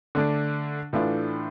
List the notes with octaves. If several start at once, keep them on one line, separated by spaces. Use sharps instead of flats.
D3 A3 D4
A2 E3 A3 D4 F4